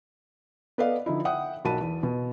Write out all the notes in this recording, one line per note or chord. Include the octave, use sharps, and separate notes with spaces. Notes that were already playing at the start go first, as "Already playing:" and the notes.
B3 A4 B4 D5 D#5 F5
D3 F3 D#4 E4
E5 F#5 G5 D#6
B1 F#4 A#4 A5 B5 D#7
E2
B2